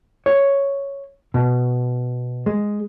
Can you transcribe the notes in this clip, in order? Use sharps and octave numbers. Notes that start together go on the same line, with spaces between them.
C#5
B2
G#3